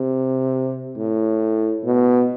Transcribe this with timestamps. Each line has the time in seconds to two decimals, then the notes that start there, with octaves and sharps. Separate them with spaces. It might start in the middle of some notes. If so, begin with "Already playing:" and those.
Already playing: C3
0.97 A2
1.85 B2